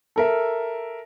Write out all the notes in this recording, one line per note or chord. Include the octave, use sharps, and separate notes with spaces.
A4 A#4 E5